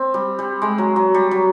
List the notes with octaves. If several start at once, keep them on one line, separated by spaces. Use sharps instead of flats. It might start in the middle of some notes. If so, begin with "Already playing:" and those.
Already playing: C4
G3
G3
G#3
F#3
F#3
G3
F#3